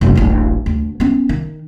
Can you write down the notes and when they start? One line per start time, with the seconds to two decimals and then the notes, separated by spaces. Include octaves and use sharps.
0.01 F1 G3
0.15 D1 A1
0.66 D2
1.00 B3 C#4
1.29 D#3